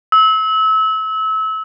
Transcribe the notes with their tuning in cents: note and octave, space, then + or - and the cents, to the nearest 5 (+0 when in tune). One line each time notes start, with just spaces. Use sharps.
E6 -30